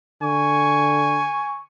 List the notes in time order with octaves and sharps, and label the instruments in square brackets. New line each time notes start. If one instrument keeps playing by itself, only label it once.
[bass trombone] D3 [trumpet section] G#5 C#6